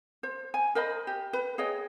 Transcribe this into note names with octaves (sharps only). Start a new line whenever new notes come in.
C5
G#5
A#4 C5 D#5 B5
G4
B4
G#4 C#5 D#5 G5